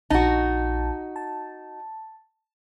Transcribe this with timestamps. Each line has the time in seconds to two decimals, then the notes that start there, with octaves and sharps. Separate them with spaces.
0.10 A#1 D#4 F#4 A5
1.16 A5